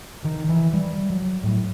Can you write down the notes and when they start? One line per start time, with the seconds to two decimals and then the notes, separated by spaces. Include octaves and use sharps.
0.25 D#3
0.49 E3
0.73 G3
1.10 F#3
1.43 A2